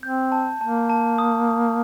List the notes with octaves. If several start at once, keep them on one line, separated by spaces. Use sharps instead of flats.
C4 G6
A5
A#3 A5
A5
D#6
D#6